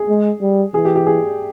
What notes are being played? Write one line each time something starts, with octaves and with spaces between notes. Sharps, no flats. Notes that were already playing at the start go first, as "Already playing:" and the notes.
Already playing: G#4
G#3
G3
E3 G#4
G4
G4
G#4